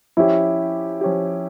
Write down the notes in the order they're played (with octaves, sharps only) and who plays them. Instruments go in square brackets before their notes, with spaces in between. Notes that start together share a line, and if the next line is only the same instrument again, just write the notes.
[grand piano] F3 C#4 G4 [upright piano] E4
[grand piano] F3 C#4 G4